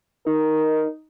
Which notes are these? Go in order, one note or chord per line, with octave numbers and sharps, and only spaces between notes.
D#4 A#4